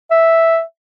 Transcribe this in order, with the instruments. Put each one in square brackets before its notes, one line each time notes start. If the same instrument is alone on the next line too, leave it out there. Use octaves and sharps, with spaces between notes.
[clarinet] E5